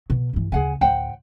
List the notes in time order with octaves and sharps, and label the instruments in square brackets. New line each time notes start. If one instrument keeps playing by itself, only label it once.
[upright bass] B2
G2 E3
[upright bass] D2 C#3 [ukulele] G#4 F#5 G#5
[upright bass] D2 A2 [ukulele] C5 F#5 G5